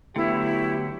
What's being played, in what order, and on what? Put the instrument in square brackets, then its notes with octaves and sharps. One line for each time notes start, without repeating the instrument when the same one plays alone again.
[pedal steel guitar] D3 F#3 [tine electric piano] A3 B3 [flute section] E4 [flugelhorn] G4